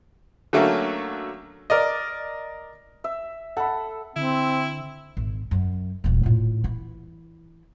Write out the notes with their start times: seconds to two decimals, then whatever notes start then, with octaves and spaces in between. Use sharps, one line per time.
0.53 D3 F#3 A3 A#3 C#4
1.70 A#4 D5 D#5
3.04 E5
3.57 A4 F#5 B5
4.16 D3 C4 E4
5.17 G#1
5.51 F#2
6.04 D#1 E3
6.23 A2 F4
6.64 E3 E4